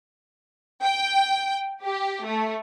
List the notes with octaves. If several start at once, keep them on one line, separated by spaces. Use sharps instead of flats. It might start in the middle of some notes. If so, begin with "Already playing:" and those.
G5
G4
A3